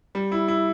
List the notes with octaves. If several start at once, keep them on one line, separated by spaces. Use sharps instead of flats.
G3
E4
E4